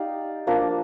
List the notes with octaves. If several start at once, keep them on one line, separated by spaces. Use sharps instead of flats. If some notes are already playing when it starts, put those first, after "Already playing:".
Already playing: D#4 G4 D5 F5
F3 A#3 D4